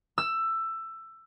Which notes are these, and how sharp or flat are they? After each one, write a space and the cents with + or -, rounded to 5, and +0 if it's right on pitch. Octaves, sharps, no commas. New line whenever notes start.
E6 +15